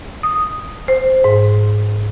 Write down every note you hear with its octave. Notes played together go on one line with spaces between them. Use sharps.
D#6
C5
G#2